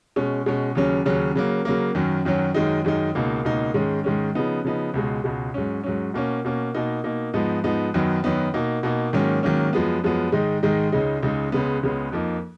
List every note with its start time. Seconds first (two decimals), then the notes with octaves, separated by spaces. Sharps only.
0.16 B2 G#3 C#4
0.46 B2 G#3 C#4
0.75 D#2 C#3 F#3 C#4
1.06 D#2 C#3 F#3 C#4
1.35 C#3 F#3 A#3
1.65 C#3 F#3 A#3
1.95 F#2 D#3 F#3 C#4
2.25 F#2 D#3 F#3 C#4
2.54 F#2 D#3 G#3 D#4
2.85 F#2 D#3 G#3 D#4
3.15 C#2 B2 A#3 D#4
3.45 C#2 B2 A#3 D#4
3.74 G#2 D#3 G#3 C#4
4.04 G#2 D#3 G#3 C#4
4.35 C#3 F3 B3 D#4
4.65 C#3 F3 B3 D#4
4.94 C#2 B2 G#3
5.24 C#2 B2 G#3
5.54 G#2 F#3 C#4
5.84 G#2 F#3 C#4
6.14 B2 A#3 C#4
6.45 B2 A#3 C#4
6.74 B2 A#3 D#4
7.04 B2 A#3 D#4
7.34 G#2 F3 B3 D#4
7.64 G#2 F3 B3 D#4
7.94 F#2 D#3 F#3 B3 D#4
8.24 F#2 D#3 F#3 B3 D#4
8.54 B2 A#3 D#4
8.83 B2 A#3 D#4
9.13 G#2 D#3 F#3 A#3 C#4
9.43 G#2 D#3 F#3 A#3 C#4
9.73 F#2 F3 G#3 B3
10.04 F#2 F3 G#3 B3
10.32 G#2 D#3 G#3 D#4
10.63 G#2 D#3 G#3 D#4
10.92 C#2 C#3 G#3 D#4
11.23 C#2 C#3 G#3 D#4
11.52 C#2 C#3 G#3 B3
11.83 C#2 C#3 G#3 B3
12.12 F2 F3 A#3 D#4